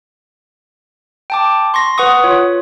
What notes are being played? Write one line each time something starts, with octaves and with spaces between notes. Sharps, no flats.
G5 A5 D6
C6 C#6 A#6
B4 F#5 C#6 D#6
F4 C#5